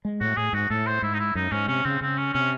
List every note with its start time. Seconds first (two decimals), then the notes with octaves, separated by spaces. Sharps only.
0.05 G#3
0.20 A2 F#4
0.37 A2 G#4
0.53 G#2 F#4
0.70 A2 A4
0.86 C5
1.02 G#2 E4
1.14 D#4
1.19 E4
1.35 F#2 D#4
1.52 G#2 C#4
1.68 C3 C#4
1.85 C#3 C4
2.01 C#3 C4
2.17 C#4
2.34 C3 C#4